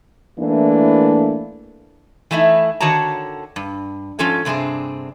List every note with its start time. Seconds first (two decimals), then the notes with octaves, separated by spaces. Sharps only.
0.39 E3 A3 A#3 D4 E4
2.31 E3 A3 D#4 E4
2.80 D3 D#3 F#4 C#5 A5 A#5
3.56 G2
4.19 G#2 F3 C#4 F4 A4 C#5
4.45 G2 C3 C4 D4 G#4